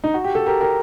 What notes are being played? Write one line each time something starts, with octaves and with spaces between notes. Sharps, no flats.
D#4
F#4
G4
A4
G4 A#4
G4 A#4